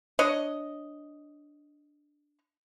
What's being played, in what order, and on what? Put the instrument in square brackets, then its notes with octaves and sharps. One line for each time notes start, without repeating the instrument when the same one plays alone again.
[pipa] D4 C#5 D#5